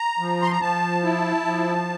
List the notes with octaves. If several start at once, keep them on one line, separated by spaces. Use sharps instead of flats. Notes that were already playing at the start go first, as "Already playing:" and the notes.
Already playing: A#5
F3
C6
A#5
F3 A5
E4
F3